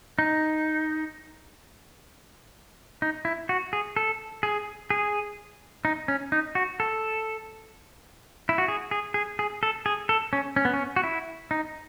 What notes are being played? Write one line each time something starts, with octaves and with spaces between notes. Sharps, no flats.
D#4
D#4
E4
F#4
G#4
A4
G#4
G#4
D#4
C#4
D#4
F#4
A4
E4
F#4
G#4
G#4
G#4
G#4
A4
G#4
A4
C#4
C#4
B3
C#4
F#4
E4
D#4